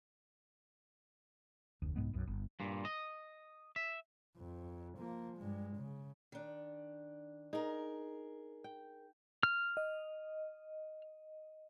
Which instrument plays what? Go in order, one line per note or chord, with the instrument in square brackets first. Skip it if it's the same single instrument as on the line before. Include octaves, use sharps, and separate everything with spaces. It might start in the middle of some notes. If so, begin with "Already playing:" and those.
[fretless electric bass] F1 D2
C2 G#2 G#3 B3
B1 F#2
G1
[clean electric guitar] G2 A#2
D#5
E5
[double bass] F2
F3 A#3
G2 G#3
C#3
[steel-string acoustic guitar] D#3 D4
[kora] D#4 [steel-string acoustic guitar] G#4 A#4
[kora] G5
[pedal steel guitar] F6
[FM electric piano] D#5